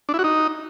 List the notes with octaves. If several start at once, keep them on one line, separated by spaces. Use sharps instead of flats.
D4
E4
F#4
D#4